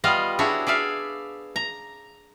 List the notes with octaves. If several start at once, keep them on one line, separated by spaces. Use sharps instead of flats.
G3 B3 F4 D#5 F5
D4 E4 F#4 G#4 C#5
G#4 D5 E5 F5
A#5